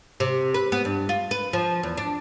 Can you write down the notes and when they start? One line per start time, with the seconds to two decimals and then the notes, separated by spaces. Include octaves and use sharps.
0.20 C3
0.54 B4
0.72 B3
0.85 G2
1.09 F4
1.31 B4
1.53 F3
1.83 E2
1.97 D4